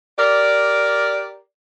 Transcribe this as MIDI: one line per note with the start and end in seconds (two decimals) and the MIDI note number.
0.18 1.39 67
0.18 1.39 70
0.18 1.39 74